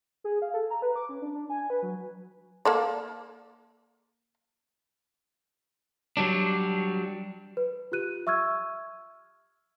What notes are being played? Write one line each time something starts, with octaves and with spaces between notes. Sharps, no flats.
G#4
F5
A4
A#5
B4
D6
C#4
D4
D4
G#5
B4
F#3
A#3 A4 D5
F#3 G3 D4
B4
F4 G4 F#6 D#7
E5 C#6 E6 F6 G#6